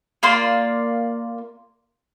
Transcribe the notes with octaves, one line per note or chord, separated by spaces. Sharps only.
A#3 F4 D5 C6